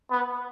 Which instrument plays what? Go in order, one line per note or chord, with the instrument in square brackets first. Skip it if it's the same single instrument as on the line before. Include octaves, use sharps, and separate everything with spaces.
[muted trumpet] B3